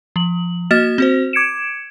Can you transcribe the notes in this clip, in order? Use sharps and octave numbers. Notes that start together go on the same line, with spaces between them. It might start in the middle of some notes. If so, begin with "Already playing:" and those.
F3 F#7
A#3 F#4 D#5 F6 A6 E7
C4 F#4 C5
D6 G#6 C#7 D7 E7